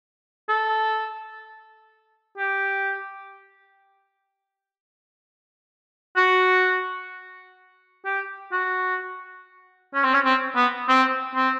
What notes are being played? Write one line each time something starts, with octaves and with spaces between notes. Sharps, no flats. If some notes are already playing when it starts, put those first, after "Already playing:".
A4
G4
F#4
G4
F#4
C#4
C4
C#4
C4
B3
C4
C4